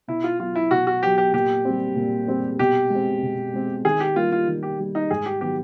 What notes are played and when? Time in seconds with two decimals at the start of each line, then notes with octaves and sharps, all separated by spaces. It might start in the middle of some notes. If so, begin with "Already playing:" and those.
0.08 B2 E4
0.24 F4
0.39 F#3 B3 F4
0.56 E4
0.71 B2 F#4
0.87 F#4
1.03 F#3 B3 G4
1.18 G4
1.33 A#2 G4
1.65 G3 C4
1.96 A#2
2.28 G3 C4
2.59 B2 G4
2.90 G#3
2.95 C4
3.22 B2
3.54 G#3 C4
3.84 D#3 G#4
4.00 G4
4.16 G3 A#3 F4
4.32 F4
4.47 D#3
4.63 G4
4.79 G3 A#3
4.95 D#4
5.10 G#2 G#4
5.26 G4
5.41 D#3 F#3 B3 G4